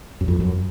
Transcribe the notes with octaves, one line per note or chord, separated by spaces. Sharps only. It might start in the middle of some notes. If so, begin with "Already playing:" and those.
F#2
F2
F#2